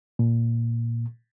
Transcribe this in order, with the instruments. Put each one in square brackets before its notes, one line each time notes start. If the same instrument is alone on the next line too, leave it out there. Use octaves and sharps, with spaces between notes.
[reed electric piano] A#2